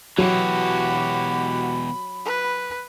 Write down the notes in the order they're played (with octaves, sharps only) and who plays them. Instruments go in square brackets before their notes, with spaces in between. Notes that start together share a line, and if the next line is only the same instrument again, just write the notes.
[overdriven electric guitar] B2 E3 [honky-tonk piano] F#3 [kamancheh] F#4 G4 [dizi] B5
[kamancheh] B4